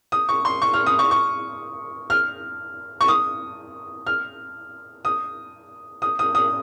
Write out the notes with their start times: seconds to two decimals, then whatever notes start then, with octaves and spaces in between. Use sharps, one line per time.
0.12 D#6
0.29 C#6
0.45 C6
0.62 C#6
0.74 F6
0.86 D#6
0.99 C#6
1.11 C#6
2.10 F6
3.01 C#6
3.08 D#6
4.07 F6
5.05 D#6
6.02 D#6
6.19 D#6
6.35 D#6